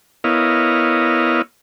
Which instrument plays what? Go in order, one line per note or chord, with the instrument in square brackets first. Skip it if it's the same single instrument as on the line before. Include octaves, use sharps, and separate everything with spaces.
[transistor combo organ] B3 E4 A#4 C#5 D#5 F5